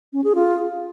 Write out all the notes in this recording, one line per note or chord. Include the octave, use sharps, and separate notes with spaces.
C#4
G#4
F4